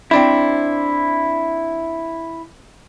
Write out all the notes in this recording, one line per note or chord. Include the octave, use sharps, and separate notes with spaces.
C4 D4 E4